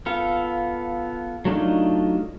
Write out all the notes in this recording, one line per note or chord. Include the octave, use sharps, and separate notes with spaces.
B3 F4 A4 F5
F#3 A3 D4 D#4 F4